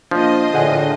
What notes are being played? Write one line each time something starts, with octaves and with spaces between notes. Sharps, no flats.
F3 A#3 D4 F4 C5 D#5
A2 D3 G#4 F#5 G#5